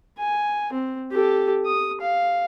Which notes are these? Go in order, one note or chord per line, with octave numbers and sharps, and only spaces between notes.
G#5
C4
G4 A4
D#6
F5